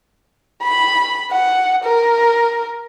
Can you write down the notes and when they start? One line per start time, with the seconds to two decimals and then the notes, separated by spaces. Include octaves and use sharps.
0.63 B5
1.32 F#5
1.84 A#4